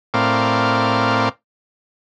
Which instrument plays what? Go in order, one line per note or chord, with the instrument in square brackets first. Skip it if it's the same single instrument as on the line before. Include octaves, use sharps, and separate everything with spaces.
[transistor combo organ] A2 C4 A#4 D5 F5